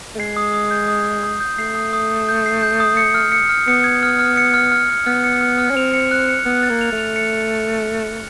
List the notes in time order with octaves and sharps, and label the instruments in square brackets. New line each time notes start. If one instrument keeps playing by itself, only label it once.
[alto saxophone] A3
[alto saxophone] G#3 [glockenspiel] C7
[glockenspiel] D#6
D#6
G6
D#6
D#6
D#6
G6
[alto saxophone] A3 [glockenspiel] C7
[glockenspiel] D#6
D#6
D#6
G6
C7
G6
D#6
C#7
F6
C#7
F6
[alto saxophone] B3 [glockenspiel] C#7
[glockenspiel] G#6
F6
F6
C#7
F6
F6
F6
[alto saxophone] B3 [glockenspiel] F6
[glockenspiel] C#7
F6
F6
[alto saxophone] C#4
[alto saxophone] C4 [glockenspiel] F7
[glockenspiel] C#7
F#6
C#7
[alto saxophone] B3 [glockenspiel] F#6
[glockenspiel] A6
[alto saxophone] A#3
[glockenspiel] F7
[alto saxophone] A3
[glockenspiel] F7
C#7